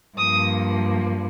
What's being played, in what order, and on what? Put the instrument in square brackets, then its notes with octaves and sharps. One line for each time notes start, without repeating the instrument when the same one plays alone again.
[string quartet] G2 F3 A#3 D#6